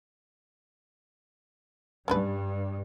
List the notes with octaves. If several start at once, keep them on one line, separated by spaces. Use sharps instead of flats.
G2 C#4 D4 B4